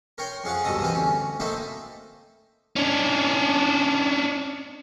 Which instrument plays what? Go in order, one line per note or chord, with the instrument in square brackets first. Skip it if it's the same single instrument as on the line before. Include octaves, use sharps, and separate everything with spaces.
[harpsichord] A#4 C#5 G5 C6
F2 G#4 F5 F#5 C#6
C2 G2 B2 A4 D#5 D#6
E3 C4 A#4 C5
D2 C#4
A3 A#3 C4 D#4 E4 C5
[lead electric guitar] C#4 D4